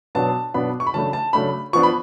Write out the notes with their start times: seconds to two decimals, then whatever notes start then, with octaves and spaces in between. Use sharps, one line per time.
0.15 B2 F#3 B3 D4 A5
0.54 B2 F#3 B3 D4 B5
0.80 C#6
0.87 B5
0.94 C#3 F#3 A3 D4 A5
1.13 A5
1.33 C#3 F#3 A3 D4 B5
1.73 F3 B3 D4 C#6
1.83 B5